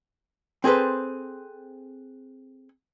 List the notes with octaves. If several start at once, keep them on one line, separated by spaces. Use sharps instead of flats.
C4 G#4 A4 B4 C5